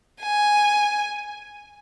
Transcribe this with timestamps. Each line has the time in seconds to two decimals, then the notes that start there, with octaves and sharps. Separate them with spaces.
0.22 G#5